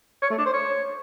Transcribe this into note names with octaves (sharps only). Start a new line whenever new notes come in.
C#5
A3
D4
C5
C#5